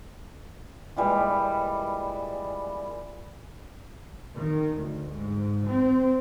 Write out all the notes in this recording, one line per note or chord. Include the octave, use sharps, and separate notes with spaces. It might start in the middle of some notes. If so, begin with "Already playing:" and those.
A#2 E3 G3 G#3
D#3
D2
G#2
C4